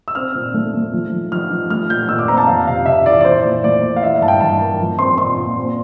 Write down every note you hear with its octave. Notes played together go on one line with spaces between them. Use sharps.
E6
C4 F6
A#2
A3
A3
F3
F3
F3 F6
F3
A3 F6
A#2 G6
A#2 E6
D6
C4 A#5
A5
F2 F5
C3 F5
C3 E5
E3 D5
D5
A#2 C5
A#2
A3 D5
A#2
F5
E3 E5
F5
G2 A5
G5
G2 A5
A#3
F3
C4 C6
A#2 C6
A#2
C4